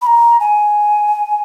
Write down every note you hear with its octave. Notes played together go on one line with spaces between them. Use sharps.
B5
A#5
G#5